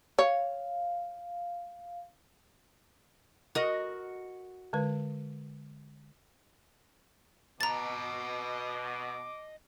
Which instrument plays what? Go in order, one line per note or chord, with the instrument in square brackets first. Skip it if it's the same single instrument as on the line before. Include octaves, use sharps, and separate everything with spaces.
[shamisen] C#5 [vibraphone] F5
[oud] F#4 A#4 D#5
[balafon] D3 G#3 B4
[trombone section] B2 [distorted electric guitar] D#5 A5 [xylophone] A#5 A6 [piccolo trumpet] D6